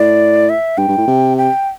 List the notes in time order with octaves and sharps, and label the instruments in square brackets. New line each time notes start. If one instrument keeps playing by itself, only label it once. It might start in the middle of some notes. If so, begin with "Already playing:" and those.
Already playing: [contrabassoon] A2 [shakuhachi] D5
[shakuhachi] E5
[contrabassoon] G2 [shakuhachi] G5
[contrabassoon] G2
A2
C3
[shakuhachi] G5